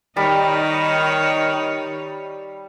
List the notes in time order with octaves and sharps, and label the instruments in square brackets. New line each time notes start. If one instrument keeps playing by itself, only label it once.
[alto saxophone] D#3 [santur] G3 [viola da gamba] D#4 C#5